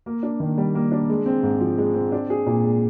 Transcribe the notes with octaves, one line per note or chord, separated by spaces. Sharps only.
A#3
D4
D#3
G3
A#3
D4
G#3
C4
G#2
F3
G#3
C4
D4
G#4
A#2
G#3